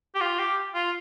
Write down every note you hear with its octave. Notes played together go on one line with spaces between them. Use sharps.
G4
F4
G4
F4